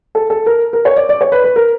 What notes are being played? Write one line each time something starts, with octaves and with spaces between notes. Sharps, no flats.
A4
A4
A#4
A#4
C#5
D5
D5
C#5
B4
B4
A#4